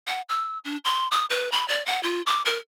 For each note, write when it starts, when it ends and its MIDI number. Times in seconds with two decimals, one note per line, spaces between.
0.07 0.21 78
0.29 0.58 88
0.65 0.77 62
0.85 1.08 84
1.11 1.26 87
1.30 1.52 71
1.52 1.67 83
1.68 1.85 74
1.86 2.02 78
2.03 2.22 65
2.27 2.42 86
2.45 2.58 70